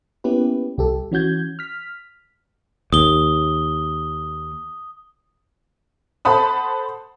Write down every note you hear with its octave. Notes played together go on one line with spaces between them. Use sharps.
A#3 B3 C#4 E4 G4 B4
C2 G4 A4
E3 C#4 F#4 G6 G#6
F6 B6
D#2 D#6 G7
A4 C5 F#5 A5 B5 D#6